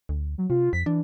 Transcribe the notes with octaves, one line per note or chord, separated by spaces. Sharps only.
D2
F#3
C3 F4
F2 B6
E3 D4